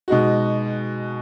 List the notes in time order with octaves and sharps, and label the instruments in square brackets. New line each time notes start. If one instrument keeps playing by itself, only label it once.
[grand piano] B2 G#3 D#4 F#4